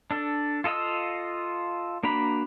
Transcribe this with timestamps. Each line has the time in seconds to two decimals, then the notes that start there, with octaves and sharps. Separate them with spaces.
0.11 D4 A4
0.64 F4 A4 D#5 F5 E6
2.03 A#3 D4 F#4 A#5 B5